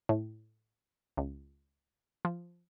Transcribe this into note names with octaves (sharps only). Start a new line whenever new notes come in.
A2
C#2
F3